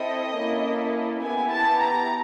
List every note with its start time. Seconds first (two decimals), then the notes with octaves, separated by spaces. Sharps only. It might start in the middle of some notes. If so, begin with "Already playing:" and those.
Already playing: C4 E4 A4 D#5
0.35 A#3 C#4 E4 A4
1.22 B3 E4 G4 G#5
1.52 A5
1.81 A#5